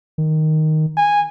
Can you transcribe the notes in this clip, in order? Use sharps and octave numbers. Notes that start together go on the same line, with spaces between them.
D#3
G#5